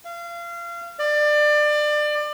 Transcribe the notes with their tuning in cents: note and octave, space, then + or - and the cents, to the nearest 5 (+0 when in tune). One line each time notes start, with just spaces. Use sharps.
F5 -30
D5 +25